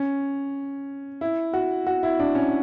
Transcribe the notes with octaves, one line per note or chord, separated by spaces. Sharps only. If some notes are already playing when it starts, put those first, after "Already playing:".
Already playing: C#4
E4
F#4
F#4
E4
D4
C#4